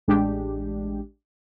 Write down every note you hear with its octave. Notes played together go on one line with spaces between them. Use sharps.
A1 G#3 D4 G4